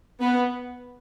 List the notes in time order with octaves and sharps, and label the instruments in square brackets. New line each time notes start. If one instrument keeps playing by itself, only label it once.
[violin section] B3